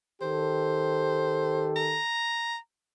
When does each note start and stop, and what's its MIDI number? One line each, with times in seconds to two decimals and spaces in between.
0.21 1.98 51
0.21 1.98 67
0.21 1.98 69
0.21 1.70 72
1.76 2.56 82